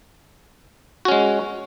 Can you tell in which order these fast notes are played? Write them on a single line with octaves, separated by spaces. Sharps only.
F#4 C#4 G#3